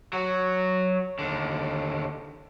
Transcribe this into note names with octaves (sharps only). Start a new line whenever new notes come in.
F#3 F#4
D#2 D3